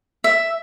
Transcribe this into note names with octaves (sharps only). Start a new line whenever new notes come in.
E5